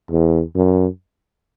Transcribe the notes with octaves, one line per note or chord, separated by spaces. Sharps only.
E2
F#2